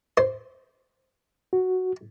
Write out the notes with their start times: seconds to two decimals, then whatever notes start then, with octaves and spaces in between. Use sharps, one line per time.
0.17 C5
1.53 F#4